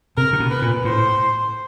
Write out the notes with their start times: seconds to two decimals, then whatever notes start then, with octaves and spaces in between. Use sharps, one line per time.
0.17 C3 A#4
0.33 C3
0.40 B2
0.51 B4
0.62 A#2
0.85 A2 C5